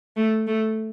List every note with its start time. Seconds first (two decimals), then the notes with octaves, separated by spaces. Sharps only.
0.16 A3
0.47 A3